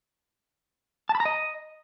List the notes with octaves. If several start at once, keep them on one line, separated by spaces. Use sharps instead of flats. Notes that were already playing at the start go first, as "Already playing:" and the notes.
A5
B5
A#5
D#5